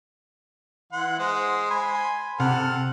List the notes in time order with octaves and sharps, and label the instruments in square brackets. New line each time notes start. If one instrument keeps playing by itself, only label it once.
[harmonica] E3 F#5 C6
G#3 C5
G#5 B5 C6
[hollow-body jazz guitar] C3 [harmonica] A4 F#5 F6